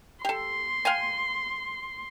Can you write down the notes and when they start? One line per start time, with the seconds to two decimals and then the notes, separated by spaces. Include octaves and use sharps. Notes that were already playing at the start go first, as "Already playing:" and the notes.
0.25 G4 A4 C6
0.85 F5 G5 G#5